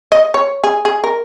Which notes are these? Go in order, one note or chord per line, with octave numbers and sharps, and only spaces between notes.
D#5
C#5
G#4
G#4
A#4